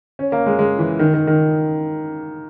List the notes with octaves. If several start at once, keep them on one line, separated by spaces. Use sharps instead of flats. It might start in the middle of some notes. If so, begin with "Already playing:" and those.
C#4
A#3
G#3
G#3
E3
D#3
D#3
D#3